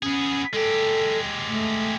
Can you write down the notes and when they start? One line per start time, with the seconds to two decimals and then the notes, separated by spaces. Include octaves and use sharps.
0.03 B3 C#4 G#4
0.54 G#3 G4 A4
1.49 A3